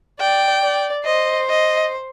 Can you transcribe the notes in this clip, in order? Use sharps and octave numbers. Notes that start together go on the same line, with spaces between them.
D5 G5
D5
C5 D#5
D#5